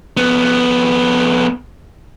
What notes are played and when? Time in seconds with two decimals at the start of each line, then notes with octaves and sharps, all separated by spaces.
0.17 F2 B3